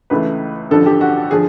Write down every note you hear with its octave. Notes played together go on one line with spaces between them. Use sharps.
C#2 C#3 E3 A3 B4
A1 G2 D3 F3 A4
G4
F#4
D3 F3 G#4